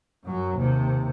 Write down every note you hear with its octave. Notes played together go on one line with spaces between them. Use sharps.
F#2 F#3
D#2 C3